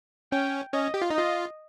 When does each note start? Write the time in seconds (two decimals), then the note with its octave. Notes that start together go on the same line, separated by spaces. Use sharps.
0.32 C#4 G5
0.73 C#4 D#5
0.94 G4
1.02 F4
1.10 D#4
1.15 F4 D#5